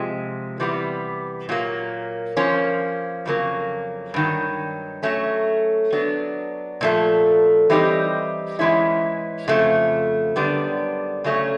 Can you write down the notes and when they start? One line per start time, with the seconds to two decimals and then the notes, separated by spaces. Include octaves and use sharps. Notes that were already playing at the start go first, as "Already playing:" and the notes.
Already playing: C3 F3 G#3
0.60 C3 E3 G3 B3
1.49 A#2 F#3 A#3
2.37 F3 A#3 C#4
3.26 F2 C#3 F#3 A#3
4.14 G2 D#3 F#3
5.03 F#3 A3 C#4
5.93 F#3 B3 D4
6.81 A#2 F3 A3
7.70 E3 G3 C4 D#4 G4
8.59 G#2 E3 G#3 C#4 E4
9.48 F2 C#3 F3 A3
10.36 F#2 D3 G3 B3 D4
11.24 C#3 F#3 A3 C#4